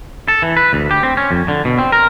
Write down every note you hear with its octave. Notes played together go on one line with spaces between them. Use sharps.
A4
E3
B4
D2
G4
C4
C#4
F2
D3
B2
C4
A#4